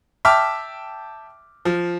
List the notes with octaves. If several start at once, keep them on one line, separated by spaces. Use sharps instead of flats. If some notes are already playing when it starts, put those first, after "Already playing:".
E5 G5 A5 D6 F6
F3